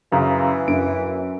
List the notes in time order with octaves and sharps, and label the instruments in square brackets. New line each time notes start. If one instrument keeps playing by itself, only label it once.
[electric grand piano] F#2 C#3 [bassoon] E3 [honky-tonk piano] F5 A#5
[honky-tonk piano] F#2 [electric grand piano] D7